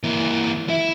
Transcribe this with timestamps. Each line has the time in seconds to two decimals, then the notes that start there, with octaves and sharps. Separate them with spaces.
0.04 E3 A#3
0.69 E4 E5